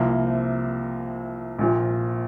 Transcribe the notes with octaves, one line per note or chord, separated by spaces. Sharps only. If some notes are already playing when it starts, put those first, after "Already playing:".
Already playing: C2 C3 F3 A#3
A#1 A#2 F3